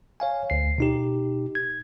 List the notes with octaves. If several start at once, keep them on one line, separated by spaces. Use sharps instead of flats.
C#5 F5 G#5
D2 C7
B2 D#4 G4
G#6